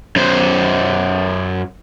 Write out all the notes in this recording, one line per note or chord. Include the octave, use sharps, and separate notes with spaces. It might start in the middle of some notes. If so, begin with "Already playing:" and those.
F#2 C5